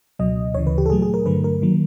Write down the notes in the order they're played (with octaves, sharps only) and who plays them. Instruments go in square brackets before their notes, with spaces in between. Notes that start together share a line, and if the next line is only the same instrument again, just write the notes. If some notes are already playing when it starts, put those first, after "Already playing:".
[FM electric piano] C#2 B2 F#3 D#5
D2 C#3 E3 C#5
B4
G4
A4
A#2 F#3 A3 G#4
G#4
A#4
G2 D3 F#3 A3 B4
A#4
D#3 F#3 A#3